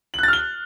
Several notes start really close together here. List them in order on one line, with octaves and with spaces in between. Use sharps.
F#7 F#6 A6 F6 G7